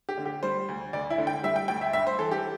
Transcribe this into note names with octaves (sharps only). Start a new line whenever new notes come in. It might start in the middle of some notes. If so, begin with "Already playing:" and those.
G4
D3
G4
G3 C5
D2
D2 D5
E4
D3
G5
G3 E5
G5
D2 G5
E5
G2 E5
C5
E3 A4
G4